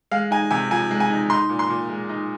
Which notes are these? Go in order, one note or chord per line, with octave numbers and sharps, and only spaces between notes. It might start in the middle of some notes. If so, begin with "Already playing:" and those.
G#3 F5
D#4 G#5
C3 G#5
F3 G#5
G#3
G#5
D#4
D#4 C6
A#2
C6
A#2
G#3
D#4